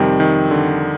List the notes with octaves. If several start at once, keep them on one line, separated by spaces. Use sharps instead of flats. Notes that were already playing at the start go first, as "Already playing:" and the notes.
Already playing: F2 C3 D#3 F3 G3 C4
D#3
D3